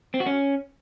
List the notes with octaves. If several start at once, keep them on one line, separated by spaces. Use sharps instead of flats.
C4
F#4
C#4